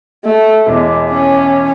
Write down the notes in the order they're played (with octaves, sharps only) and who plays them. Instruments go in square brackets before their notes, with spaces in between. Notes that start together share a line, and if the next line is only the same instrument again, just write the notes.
[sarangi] A3
[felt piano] E1 E2 [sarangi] G#3
[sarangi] C#4